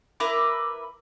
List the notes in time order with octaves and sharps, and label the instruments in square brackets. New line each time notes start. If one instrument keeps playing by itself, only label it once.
[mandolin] E4 A#4 B4 D6